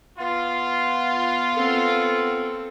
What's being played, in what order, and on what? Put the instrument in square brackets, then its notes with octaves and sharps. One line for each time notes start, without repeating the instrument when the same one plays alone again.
[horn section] B3 F4
[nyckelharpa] C4 A4